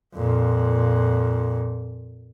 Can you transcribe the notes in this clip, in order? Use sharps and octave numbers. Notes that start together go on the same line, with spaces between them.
F2 A#2